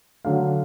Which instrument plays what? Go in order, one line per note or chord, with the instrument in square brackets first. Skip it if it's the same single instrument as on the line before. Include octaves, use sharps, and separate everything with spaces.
[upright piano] D3 F#3 A3 F5